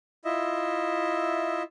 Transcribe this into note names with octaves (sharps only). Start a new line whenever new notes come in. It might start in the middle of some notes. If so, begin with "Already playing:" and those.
E4 F4 D#5 E5